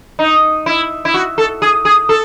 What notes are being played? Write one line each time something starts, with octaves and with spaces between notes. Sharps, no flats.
D#4
E4
E4
F#4
A4
G#4
G#4
A4